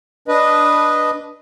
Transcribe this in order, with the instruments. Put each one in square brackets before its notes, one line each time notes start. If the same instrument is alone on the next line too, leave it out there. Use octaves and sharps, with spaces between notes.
[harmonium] D4 B4 D#5